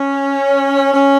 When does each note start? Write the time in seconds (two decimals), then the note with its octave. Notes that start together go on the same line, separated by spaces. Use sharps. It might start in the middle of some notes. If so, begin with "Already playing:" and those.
Already playing: C#4
0.93 C#4